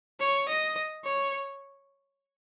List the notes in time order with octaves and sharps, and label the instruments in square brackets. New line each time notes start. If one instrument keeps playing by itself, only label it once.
[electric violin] C#5
D#5
C#5